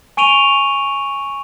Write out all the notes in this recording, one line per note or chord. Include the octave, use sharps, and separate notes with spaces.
G#5 C#6 D7 D#7 F7 G7